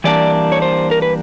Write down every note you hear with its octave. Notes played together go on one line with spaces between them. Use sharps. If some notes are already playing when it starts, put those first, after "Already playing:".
E3 G3 A#3 D4 D5
C#5
C5
A#4
B4